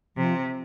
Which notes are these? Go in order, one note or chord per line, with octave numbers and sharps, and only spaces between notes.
C3 F3